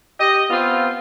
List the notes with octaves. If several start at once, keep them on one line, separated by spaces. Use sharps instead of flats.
G4 D#5
B3 C4 F4